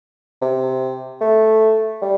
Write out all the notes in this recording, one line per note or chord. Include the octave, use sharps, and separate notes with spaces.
C3
A3
G3